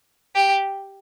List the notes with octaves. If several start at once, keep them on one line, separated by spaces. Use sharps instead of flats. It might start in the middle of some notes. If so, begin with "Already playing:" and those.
G4